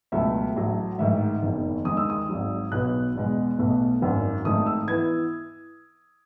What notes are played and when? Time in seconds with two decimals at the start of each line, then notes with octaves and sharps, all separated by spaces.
0.12 C#2 B2 F#3 A3 E5
0.56 A1 A2 F#3 A3
0.99 A1 G#2 D#3 E5
1.42 F#1 E2 D#3
1.85 D#2 D#3 G#3 D#6
1.97 E6
2.10 D#6
2.29 G#1 G#2 F#3
2.72 B1 B2 F#3 B3 F#6
3.15 E2 B2 G#3
3.58 B1 B2 A3
4.01 G#1 F#2 D#3 F#3
4.45 G#1 G#2 D#3 A3 D#6
4.67 E6
4.88 E3 B3 G#6